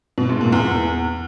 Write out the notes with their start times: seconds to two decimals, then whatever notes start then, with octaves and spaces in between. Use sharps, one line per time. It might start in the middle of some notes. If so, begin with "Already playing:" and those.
0.18 B2
0.29 G#2
0.41 A#2
0.52 E2